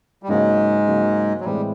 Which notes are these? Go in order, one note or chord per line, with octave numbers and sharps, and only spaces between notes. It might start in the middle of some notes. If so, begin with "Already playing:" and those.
G3
G#2 C#3 F#3 G#3 A#3
C#3 F#3 A#3
F#3
A2 E3 G3 G#3 C4